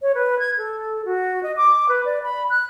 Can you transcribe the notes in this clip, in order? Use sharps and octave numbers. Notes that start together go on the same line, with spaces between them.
C#5
B4
G#6
A4
F#4
D#5
D6
B4
D5
B5
F#6